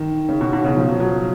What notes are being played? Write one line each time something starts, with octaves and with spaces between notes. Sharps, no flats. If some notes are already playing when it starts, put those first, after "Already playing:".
Already playing: D#3
C#3
B2
B2
C#3
F3
F#3
F#3